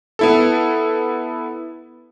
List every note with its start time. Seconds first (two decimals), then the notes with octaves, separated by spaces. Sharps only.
0.19 B3 E4 A4